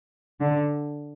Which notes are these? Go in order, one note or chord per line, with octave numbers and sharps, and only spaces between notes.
D3